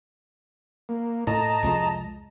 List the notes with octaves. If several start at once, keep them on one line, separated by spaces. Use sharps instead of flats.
A#3
A2 D#5 A5 A#5
C2 F2 G#3